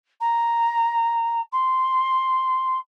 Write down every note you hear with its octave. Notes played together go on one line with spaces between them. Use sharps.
A#5
C6